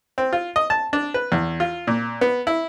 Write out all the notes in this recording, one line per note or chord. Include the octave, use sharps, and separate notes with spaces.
C4
F4
D#5
A5
D4
B4
E2
F4
A#2
B3
E4